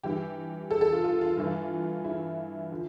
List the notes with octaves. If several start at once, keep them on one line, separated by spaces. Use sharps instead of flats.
G2 E3 G4
A4
A4
F4
F4
F4
G2 E3
E4
D3 F3